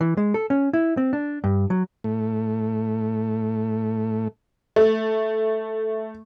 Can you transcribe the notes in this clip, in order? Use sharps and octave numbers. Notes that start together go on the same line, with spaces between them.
E3
G#3
A4
C#4
E4
C4
D4
G2
F#3
A2 A3
A3